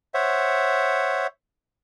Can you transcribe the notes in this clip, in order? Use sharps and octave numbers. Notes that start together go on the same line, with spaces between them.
C5 C#5 E5 F#5